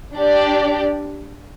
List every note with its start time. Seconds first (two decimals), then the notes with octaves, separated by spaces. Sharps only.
0.15 D4 G4 D5